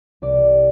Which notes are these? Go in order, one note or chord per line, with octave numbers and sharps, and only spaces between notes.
C2 D5